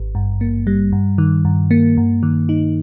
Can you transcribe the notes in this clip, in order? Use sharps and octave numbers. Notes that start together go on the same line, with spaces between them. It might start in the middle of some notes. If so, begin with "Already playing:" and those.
Already playing: G#1
G2
A#3
G3
G2
D#3
G2
A#3
G2
D#3
D#4